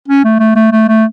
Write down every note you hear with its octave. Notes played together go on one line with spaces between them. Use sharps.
C#4
A3
A3
A3
A3
A3